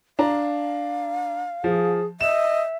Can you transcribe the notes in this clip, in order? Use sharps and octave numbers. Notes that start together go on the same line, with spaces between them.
D4 F5 A#5
F3 G#4
D#5 E5 E7